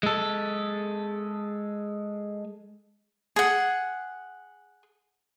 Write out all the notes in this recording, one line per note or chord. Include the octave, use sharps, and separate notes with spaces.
G#3 A4
G#4 F#5